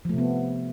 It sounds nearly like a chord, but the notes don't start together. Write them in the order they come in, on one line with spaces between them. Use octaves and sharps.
F3 A3 C3 B3